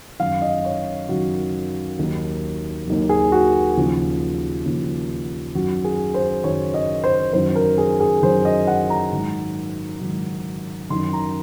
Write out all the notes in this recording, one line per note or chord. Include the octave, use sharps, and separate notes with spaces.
F#2 D#3 F#3 F5
D#5
C#5
F#2 D#3 F#3 F#4
D#2 D#3 F#3
D#2 D#3 F#3
G#4
F#4
D#2 C#3 F3
D#2 C#3 F3
F#2 D#3 F#3 F#4
G#4
C5
F#2 D#3 F#3 C#5
D#5
C5
F#2 D#3 F#3 C5
A#4
G#4
G#4
F#2 D#3 F#3 C5
D#5
F#5
A#5
G#2 D#3 F#3
G#2 D#3 F#3
F#2 D#3 F#3 C6
A#5